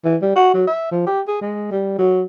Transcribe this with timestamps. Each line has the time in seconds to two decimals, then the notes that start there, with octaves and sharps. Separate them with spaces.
0.05 E3
0.22 G3
0.35 F#4
0.54 F#3
0.67 E5
0.91 F3
1.07 G4
1.28 G#4
1.41 G#3
1.71 G3
1.98 F#3